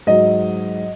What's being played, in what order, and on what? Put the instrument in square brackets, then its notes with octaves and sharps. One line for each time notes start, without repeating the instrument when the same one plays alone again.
[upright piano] G#2 F#3 D#5